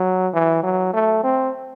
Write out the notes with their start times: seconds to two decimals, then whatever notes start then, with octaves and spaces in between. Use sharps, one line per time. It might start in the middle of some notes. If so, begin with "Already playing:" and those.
Already playing: F#3
0.33 E3
0.63 F#3
0.94 A3
1.23 C4